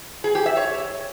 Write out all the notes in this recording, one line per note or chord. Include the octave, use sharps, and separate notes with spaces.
G#4
G4
E5
C#5